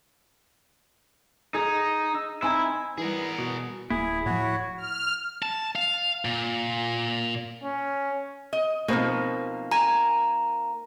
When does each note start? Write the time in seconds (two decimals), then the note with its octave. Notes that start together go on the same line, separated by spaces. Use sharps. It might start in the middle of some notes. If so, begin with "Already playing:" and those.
1.54 D#4 G#4
2.14 E6
2.42 C4 D#4 E4 G#5
2.98 E3 G3 B3 G#4 A#4
3.38 B2
3.90 D1 A#3 E4 G#4
4.26 A2 F3 F#4 C#5
4.77 F6
5.42 A5
5.76 F5
6.25 A#2
7.64 C#4
8.53 D#5
8.88 B2 F3 A#3 C4 D#4
9.71 G#5 A#5